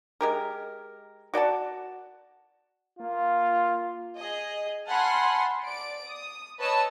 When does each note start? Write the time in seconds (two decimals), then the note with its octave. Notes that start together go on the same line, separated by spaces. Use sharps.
0.21 G#3 G4 A#4
1.34 F#4 D5 F#5 A5
2.99 A#3 F4
4.17 G#4 D#5
4.88 F#5 G#5 A5 B5 C6 F6
5.65 D5 D7
6.06 D#6
6.59 B4 C#5 D#5 A5 D#6 E6